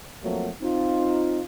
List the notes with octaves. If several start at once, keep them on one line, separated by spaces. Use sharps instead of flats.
F3 F#3 A3 A#3 C4 F#4
C4 D#4 F4